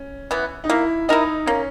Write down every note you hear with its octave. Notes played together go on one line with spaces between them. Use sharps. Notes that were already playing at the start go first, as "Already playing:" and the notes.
Already playing: C#4
E3 B3
D#4
A#3 E4
D#4 E4 A#4 D#5
A#3 C#4